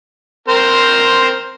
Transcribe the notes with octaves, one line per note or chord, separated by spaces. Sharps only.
C4 A#4 C5